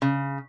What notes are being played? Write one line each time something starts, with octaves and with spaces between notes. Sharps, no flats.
C#3